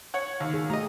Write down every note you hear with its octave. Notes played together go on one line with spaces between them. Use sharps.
C#5 F#5
D#2
G#4
A3 G4 D#5 A#5